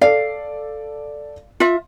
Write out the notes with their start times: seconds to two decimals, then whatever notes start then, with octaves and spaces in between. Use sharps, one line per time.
0.01 A4 D5 F5
1.60 F4 E5